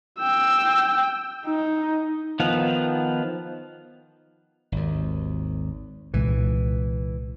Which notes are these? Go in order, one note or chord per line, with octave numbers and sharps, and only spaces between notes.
G5 E6
D#4
D#3 F3 B3
G#1 D#2
C2 A#2 E3 G#3